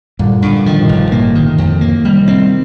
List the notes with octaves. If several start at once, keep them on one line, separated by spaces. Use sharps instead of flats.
G2 A#2 D3
G2
C3 D#3 F3
A2 C3
G1
A#2
A2 C3 A#3
D#3
F2
A#3
C3 D#3 G3
C4